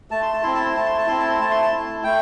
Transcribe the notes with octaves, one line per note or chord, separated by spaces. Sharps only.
A3 A5
C6
A5
C4 E4 C6
A5
C6
A3 A5
C6
A5
C4 E4 C6
A5
C6
A3 A5
C6
A5
E4
A3 G5